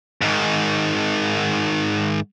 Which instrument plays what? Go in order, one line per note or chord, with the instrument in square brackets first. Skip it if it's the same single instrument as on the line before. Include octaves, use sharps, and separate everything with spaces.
[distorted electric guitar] G#2 D#3